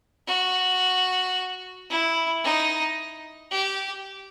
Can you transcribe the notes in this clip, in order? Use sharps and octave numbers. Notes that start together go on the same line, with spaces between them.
F#4
E4
D#4
G4